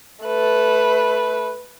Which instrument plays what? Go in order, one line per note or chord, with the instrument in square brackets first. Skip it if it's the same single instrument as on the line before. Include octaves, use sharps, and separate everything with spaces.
[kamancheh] A3 B4